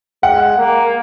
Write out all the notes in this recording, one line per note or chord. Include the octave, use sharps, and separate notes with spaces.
G#3 F#5
A#3